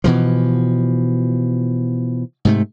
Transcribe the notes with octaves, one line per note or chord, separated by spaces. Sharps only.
B2 E3 F3
G#2 C3 A3